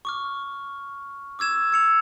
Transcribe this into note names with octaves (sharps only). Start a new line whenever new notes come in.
C#6 D6 F6
D6 E6 G#6 E7
E6 C#7 F7